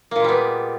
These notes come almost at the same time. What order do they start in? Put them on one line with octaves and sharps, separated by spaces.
A#3 A#2 G#3 G3 B3